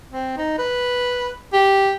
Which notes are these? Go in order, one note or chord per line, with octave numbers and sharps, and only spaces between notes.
C4
D#4
B4
G4